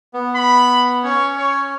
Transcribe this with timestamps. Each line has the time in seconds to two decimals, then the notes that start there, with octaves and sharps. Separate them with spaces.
0.13 B3
0.36 B5
1.04 C#4 C#5
1.37 C#5